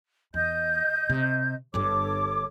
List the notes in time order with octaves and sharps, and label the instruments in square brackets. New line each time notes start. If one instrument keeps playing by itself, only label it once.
[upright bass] E2 [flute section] D#5 G6
[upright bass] C3
[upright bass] G1 G2 [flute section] A4 C#5 D6